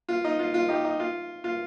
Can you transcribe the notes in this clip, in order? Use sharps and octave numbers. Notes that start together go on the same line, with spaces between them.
F4
D#4
F4
F4
D#4 G4
D#4
F4
F4